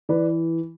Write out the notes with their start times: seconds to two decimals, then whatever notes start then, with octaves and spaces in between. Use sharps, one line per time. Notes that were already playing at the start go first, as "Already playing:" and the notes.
0.09 E3 B4 D5